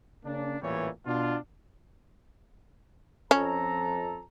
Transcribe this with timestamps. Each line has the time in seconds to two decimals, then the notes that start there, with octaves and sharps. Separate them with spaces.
0.24 C#3 A#3 C#4 D4
0.61 A1 E2 A#2 E3 G3 C#5
1.05 B2 D4 F4
3.31 F2 C#4 A4 A#5